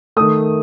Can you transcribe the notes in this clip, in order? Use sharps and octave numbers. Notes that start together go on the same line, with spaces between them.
D#3 A3 D#6